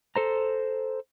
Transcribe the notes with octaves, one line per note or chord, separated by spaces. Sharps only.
A4 C5 A#5